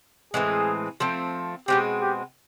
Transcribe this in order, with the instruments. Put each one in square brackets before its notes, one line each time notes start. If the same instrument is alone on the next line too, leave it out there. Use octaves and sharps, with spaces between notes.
[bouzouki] A2 E3 G#3 C4 [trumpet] G#4
[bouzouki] F3 A3 C4
[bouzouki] B2 G#3 C4 [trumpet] G4
[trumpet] G4